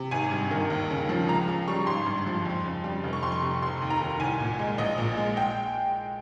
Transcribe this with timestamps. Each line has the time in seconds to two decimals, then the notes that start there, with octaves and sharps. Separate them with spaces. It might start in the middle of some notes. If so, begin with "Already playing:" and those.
Already playing: C3
0.11 G#1 G#5
0.31 G2
0.51 D#3
0.70 D#2
0.90 C#3
1.09 F3
1.28 C#2 A#5
1.48 C#3
1.68 G3 C#6
1.87 G#1 C6
2.06 G2
2.26 F3
2.45 F2
2.65 C#3
2.84 G3
3.04 F1
3.13 C#6
3.23 F2 C6
3.32 C#6
3.42 C3
3.62 F1 C6
3.82 D#2
3.90 A#5
4.01 D#3
4.20 C2 G#5
4.40 A#2
4.59 G#3
4.78 A#1 D#5
4.98 A#2
5.18 G#3
5.37 G5